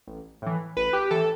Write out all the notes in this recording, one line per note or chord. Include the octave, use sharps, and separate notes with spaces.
A1
A2 E3
A1 B4
G4
A2 E3 A4